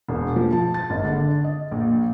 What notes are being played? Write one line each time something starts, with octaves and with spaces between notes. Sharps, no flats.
E1
F3
A5
A6
G#1
D3
D#5
A#1